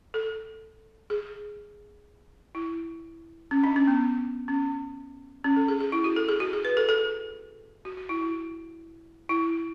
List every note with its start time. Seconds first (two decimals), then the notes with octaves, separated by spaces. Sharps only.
0.14 A4
1.10 G#4
2.55 E4
3.51 C#4
3.63 D4
3.76 C#4
3.88 B3
4.48 C#4
5.44 C#4
5.56 A4
5.68 G#4
5.81 G#4
5.92 E4
6.04 F#4
6.16 A4
6.29 G#4
6.40 F#4
6.53 G#4
6.65 B4
6.77 A4
6.89 A4
7.85 F#4
7.97 F#4
8.09 E4
8.21 E4
9.29 E4